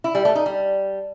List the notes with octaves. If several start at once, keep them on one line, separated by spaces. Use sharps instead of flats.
E4
G3
A3
D#4
G3